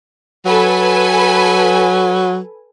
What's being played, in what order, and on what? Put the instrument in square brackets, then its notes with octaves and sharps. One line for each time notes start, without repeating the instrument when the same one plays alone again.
[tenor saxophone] F#3 [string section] A4 B4 G#5